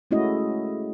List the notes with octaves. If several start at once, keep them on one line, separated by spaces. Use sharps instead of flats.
G#3 A3 C#4 E4 F#4 D#5